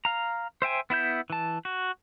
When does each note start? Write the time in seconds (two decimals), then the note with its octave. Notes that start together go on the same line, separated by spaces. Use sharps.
0.05 F5 A#5
0.62 C5 E5 G5 G#5
0.90 B3 E4 E5 G6
1.30 E3 A5
1.65 F#4